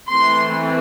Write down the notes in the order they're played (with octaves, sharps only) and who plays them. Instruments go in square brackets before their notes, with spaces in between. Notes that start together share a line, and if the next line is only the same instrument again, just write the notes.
[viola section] E3 A3 C4 C6